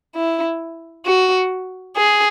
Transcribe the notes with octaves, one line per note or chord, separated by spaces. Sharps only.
E4
F#4
G#4